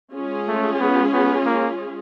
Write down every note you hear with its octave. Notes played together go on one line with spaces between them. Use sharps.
G#3 C#4 F4 G#4
A3
B3
B3
A#3